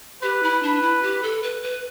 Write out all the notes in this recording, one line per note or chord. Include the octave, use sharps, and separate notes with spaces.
G4 B4
E4
D4
E4
G4
A4
B4
B4